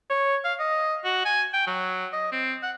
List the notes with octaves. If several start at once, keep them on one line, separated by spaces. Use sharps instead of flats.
C#5
F5
D#5
F#4
G#5
G5
F#3
D#5
C4
F#5